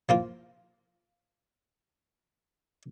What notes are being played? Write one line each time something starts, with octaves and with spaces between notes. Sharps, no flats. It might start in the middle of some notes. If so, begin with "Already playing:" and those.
F3 A#3 F4